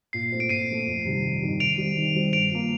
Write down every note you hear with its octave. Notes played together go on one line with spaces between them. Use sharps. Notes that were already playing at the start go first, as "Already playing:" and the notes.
A#2 C7
A3 C4 F4
D7
A#2 C7 D#7
A3 C4 F4
F2
C3 D#3 G3
F2
C3 D#3 G3
D#3 D7 F7
G3 C4
D#3
G3 C4
G2 D7 F7
F3 A#3